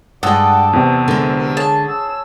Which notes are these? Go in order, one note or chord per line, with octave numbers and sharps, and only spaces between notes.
G2 G#3 A4 D5 F#5 G5 D#6
E2 C3
D3 G#3 A#4
G#4 C#5 A5
E6